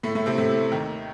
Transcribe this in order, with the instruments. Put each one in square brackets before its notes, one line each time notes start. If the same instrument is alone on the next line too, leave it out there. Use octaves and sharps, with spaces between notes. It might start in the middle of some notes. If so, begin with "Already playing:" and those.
[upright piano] A2 A3
A2 A3
C3 C4
A2 A3
D#2 D#3